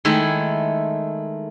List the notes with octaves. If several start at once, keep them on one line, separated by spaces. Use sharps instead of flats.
D#3 G#3 A3 E4